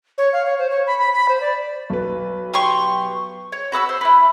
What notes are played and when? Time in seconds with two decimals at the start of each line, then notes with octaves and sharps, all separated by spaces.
0.18 C#5
0.33 F5
0.46 C#5
0.59 C5
0.70 C#5
0.87 B5
0.99 B5
1.12 B5
1.29 C5
1.41 D5
1.90 B1 B4
2.54 G4 C6 C#6
3.52 C#5
3.72 F#4 B4 D#6 E6
3.89 C5
4.01 E4 B4